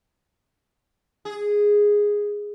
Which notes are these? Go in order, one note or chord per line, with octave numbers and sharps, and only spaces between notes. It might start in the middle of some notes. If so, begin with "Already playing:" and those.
G#4